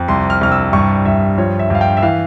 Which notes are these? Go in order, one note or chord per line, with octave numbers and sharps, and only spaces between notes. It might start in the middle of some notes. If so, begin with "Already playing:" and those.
Already playing: F2
C2 C6
F6
C2 F6
E6
G2 C#6
G2 E5
F3 C#5
E5
G2 F5
G5
E5
E3 F5